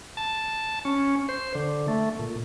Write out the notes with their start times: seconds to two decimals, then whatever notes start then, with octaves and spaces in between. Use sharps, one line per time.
0.17 A5
0.85 C#4
1.29 C5
1.55 D3
1.88 A3
2.19 A#2